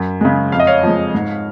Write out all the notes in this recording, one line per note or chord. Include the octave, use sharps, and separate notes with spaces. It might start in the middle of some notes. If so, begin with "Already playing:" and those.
Already playing: F#2
C#3 G#3
F2 F5
D#5
C#5 F5
F3 G#3
G#2